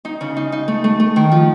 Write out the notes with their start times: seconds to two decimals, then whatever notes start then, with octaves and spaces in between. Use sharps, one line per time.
0.05 D#4
0.21 C#3
0.37 D#4
0.52 D#4
0.68 A3
0.84 A3
1.00 A3
1.16 D#3
1.32 F3